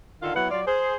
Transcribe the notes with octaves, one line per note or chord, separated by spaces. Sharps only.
D3 D#3 F4 A4 F5
F#3 B3 E4 B4 F#5
F#3 F4 D5
G#4 C5